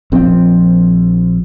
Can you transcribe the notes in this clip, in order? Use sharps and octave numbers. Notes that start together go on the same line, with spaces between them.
A#1 F3 C4